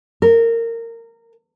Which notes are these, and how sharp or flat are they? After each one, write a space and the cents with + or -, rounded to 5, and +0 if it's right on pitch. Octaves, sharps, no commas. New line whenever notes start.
A#4 -20